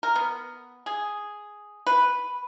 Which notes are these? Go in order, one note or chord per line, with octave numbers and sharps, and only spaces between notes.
A#4
B3
G#4
B4